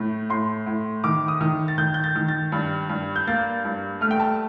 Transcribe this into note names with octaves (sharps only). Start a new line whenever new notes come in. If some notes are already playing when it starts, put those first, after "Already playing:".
Already playing: A2 A3
A2 C6
A2
D#3 D6
D#6
D#3
A6
D#3 G6
G6
A6
D#3
A6
G2
G2
G6
A#3 A6
G2
A3 F6
G5
A5